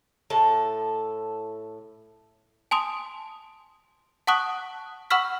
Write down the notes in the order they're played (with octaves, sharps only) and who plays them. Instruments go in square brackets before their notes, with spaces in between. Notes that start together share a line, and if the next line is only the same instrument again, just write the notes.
[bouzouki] A2 A4
[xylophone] G#5 A5 C6 D#6
F#5 A5 C#6 D#6 F#6
F#5 B5 C#6 E6 F6 B6